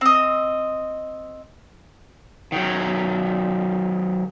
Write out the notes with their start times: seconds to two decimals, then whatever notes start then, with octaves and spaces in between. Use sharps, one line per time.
0.01 C4 D#5
2.52 D#3 F#3